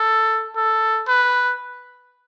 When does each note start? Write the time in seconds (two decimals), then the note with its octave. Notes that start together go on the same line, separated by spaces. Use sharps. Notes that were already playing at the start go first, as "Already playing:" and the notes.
Already playing: A4
0.56 A4
1.08 B4